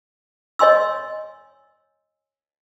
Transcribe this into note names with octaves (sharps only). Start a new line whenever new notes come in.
C#5 D#5 G#5 C6 E6